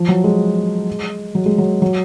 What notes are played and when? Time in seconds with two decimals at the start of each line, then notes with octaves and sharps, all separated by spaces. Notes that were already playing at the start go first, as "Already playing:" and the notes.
Already playing: F3
0.08 F#3
0.24 G#3
1.35 F#3
1.46 G#3
1.58 F#3
1.82 F#3